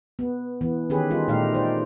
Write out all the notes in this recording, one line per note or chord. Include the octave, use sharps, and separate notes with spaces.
B3
E3 B3
D#3 C#4 G4 G#4 B4
G3 D#4 F4
A#2 A3 D#4 G4 F5
C5 D5